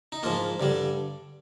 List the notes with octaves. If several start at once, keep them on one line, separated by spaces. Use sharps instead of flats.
D#4
G#2 F3 A#3 F4
G2 D3 G3